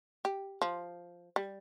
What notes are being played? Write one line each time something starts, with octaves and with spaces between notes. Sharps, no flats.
G4
F3
G3